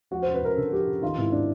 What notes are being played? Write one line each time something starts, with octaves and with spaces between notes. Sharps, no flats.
F3 F#4
F#2 C5
B4
F#2 A#4
D3 A4
F3 G4
F#2
D#3 F4
G#1 E4
F#3 D4